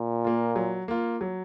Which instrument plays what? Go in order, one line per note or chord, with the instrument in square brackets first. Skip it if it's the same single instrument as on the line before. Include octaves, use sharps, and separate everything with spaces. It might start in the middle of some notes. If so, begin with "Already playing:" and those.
Already playing: [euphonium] A#2
[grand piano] A#3 F4
F#3
A#3 F4
F#3